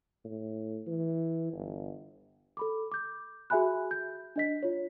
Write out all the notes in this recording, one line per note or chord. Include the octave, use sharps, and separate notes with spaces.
A2
E3
G1
A4 B5 D6
D6 G6
F#4 G#4 E5 G#5 B5 F#6
G6
D4 D#5 B6
F4 C#5